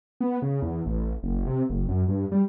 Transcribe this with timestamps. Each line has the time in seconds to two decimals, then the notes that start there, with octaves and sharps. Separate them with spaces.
0.21 B3
0.42 C#3
0.62 E2
0.86 A1
1.23 F#1
1.47 C3
1.70 F#1
1.88 F#2
2.08 G2
2.32 G3